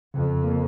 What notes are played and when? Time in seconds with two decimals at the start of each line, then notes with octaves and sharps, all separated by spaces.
0.14 F2 C#3
0.44 A#3